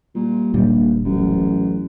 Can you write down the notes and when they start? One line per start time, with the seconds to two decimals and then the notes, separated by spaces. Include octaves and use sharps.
0.15 A#2 G3
0.54 D#1 G2 A#2 G3 A#3
1.05 A1 F#2